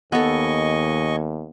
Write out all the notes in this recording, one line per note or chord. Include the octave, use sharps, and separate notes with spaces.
D#2 B3 A4 D#5 G#5 C#6